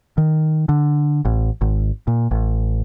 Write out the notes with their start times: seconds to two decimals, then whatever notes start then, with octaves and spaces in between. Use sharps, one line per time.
0.18 D#3
0.69 D3
1.25 A1
1.61 G#1
2.07 A#2
2.31 A1